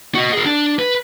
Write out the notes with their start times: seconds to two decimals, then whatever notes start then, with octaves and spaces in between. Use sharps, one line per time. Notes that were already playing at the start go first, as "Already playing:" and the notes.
0.15 F#4 D#5
0.33 G#4 A#4
0.46 D4
0.79 B4